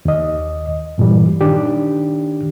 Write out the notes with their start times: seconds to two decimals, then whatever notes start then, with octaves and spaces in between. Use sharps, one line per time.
0.05 D#2 D#5
0.98 G2 A#2 E3 G3
1.41 D#3 D4 G4